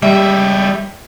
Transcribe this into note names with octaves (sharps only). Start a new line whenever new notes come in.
G3 G#3 G4 E5